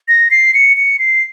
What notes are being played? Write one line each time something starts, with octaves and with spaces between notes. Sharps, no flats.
A#6
C7
C#7
C#7
C7